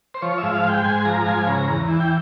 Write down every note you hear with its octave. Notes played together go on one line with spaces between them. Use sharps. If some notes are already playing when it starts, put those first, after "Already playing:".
C5
F3 C#5
G#2 E5
F5
G#3
G5
G#2 G#5
F3 A#5
G#2 G#5
C#3 A#5
E2
E3
G5